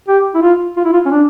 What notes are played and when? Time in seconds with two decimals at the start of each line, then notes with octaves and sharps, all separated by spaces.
0.08 G4
0.35 E4
0.42 F4
0.77 F4
0.85 E4
0.93 F4
1.06 C#4
1.11 D4